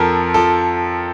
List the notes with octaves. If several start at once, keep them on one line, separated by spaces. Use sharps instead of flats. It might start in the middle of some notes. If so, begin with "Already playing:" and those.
Already playing: F2 F3 A4 A#4
F3 A4